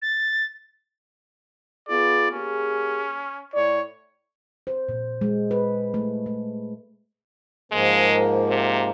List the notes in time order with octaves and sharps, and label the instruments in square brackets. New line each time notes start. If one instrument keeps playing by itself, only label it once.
[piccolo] A6
[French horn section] B3 F4 G#4 [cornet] D5
[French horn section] A#3 G4 G#4 [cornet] C#4
[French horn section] A2 E4 D5 [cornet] C#5
[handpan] C5
A#2
G#3
B4
A3
A3
[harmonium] G#2 F3 A#3 [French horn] G#3
[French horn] C3